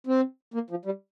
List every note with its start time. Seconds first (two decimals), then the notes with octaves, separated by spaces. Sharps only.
0.07 C4
0.54 A#3
0.70 F3
0.85 G3